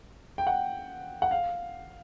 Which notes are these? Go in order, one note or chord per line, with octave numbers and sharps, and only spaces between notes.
G5
F#5
F#5
F5